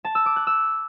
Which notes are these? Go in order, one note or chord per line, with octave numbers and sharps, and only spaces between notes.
A5
E6
D6
F#6
E6